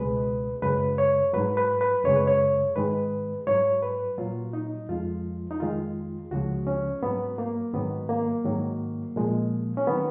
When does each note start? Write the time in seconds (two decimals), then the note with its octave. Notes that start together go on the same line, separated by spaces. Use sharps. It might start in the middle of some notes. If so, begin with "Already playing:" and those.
Already playing: C#2 B2 G#3 B4
0.62 F#2 C#3 G#3 B4
0.98 C#5
1.33 G#2 F#3 B4
1.57 B4
1.81 B4
2.04 F#2 C#3 G#3 C#5
2.16 B4
2.27 C#5
2.76 G#2 D#3 G#3 B4
3.47 G#2 F#3 C#5
3.83 B4
4.18 A#2 F#3 F4
4.53 D#4
4.89 F2 F3 G#3 F4
5.51 D#4
5.60 F2 D#3 G#3 F4
6.31 C#2 C#3 F3 G#3 F#4
6.67 C#4
7.02 G#2 F#3 B3
7.38 A#3
7.74 G#2 D#3 F#3 B3
8.09 A#3
8.45 G#2 D#3 F#3
9.16 A#2 F3 G#3
9.77 C#4
9.87 D#3 F#3 B3